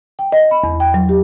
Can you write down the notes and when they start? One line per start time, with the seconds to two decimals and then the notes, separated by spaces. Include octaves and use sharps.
0.19 G5
0.32 D#5
0.51 B5
0.64 E2
0.80 G5
0.94 F#3
1.09 G4